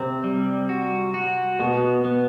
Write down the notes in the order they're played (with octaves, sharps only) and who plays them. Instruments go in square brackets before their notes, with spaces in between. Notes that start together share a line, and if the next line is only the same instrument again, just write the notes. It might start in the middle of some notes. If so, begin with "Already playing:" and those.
Already playing: [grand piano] C3 [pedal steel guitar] C4
[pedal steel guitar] G3
F#4
F#4
[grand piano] B2 [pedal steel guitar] B3
[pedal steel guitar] B3